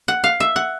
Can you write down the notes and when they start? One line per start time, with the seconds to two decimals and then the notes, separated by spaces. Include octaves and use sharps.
0.08 F#5
0.24 F5
0.40 E5
0.56 F#5